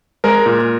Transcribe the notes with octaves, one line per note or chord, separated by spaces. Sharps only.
G#3 A#4
A#2